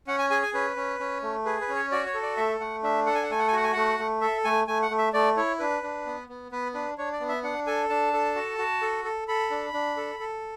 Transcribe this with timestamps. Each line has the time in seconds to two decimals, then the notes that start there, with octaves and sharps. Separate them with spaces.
0.07 C#4 F#5
0.18 G#5
0.30 G#4 G#5
0.42 G#5
0.54 C#4 B4
0.76 C#4
1.00 C#4
1.22 A3
1.46 G#4 B4
1.61 B4
1.69 C#4
1.75 C#5
1.92 F#4 D5
2.06 C#5
2.14 A4
2.22 D5
2.37 A3 E5
2.60 A3 F#5
2.83 D4 E5
3.06 A4 F#5
3.15 G#5
3.23 F#5
3.30 A3 G#5
3.39 F#5
3.48 G#5
3.53 F#4 F#5
3.64 G#5
3.73 A3 F#5
3.99 A3
4.21 A4 E5
4.44 A3 G#5
4.67 A3 G#5
4.82 F#5
4.90 A3
4.98 E5
5.13 A3 D5
5.36 E4 C#5
5.59 D4 B4
5.83 D4
6.06 B3
6.29 B3
6.52 B3 B4
6.74 D4 B4
6.98 D4 C#5
7.13 D5
7.20 B3
7.29 E5
7.43 D4 F#5
7.66 A4 G#5
7.89 D4 A5
8.13 A4
8.35 F#4
8.58 F#4
8.82 A4
9.04 A4
9.28 A4 B5
9.50 D4
9.73 D4
9.97 A4
10.20 A4